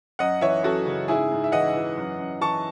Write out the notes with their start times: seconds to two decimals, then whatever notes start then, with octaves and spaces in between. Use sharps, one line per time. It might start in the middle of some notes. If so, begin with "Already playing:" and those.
0.19 F#2 D#5 F#5
0.41 E3 C#5 E5
0.63 F#2 F#4 A4
0.86 C#3
1.08 G#2 E4 G#4
1.31 G#2
1.44 E5
1.52 E3 D#5 F#5
1.75 E3
1.97 F#2
2.19 F#2
2.41 E3 A5 C#6